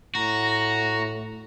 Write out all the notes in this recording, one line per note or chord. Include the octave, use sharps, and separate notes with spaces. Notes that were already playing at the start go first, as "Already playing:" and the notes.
A2 F#4 A#5